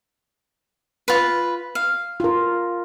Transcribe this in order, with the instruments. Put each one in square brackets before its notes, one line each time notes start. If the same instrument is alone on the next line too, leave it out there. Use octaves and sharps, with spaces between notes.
[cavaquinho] F4 B4
F5
[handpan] F4 A#4